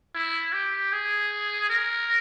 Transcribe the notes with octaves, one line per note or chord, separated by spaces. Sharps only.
E4
G4
G#4
A#4